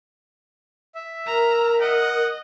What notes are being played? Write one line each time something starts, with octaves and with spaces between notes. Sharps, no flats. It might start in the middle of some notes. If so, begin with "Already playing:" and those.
E5
A#4 A#5
D#5 F#5